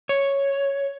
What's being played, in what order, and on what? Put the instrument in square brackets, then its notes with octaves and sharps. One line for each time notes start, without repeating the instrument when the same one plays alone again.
[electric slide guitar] C#5